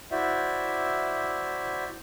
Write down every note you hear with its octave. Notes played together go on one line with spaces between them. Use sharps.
E4 F#4 C5 D5 E5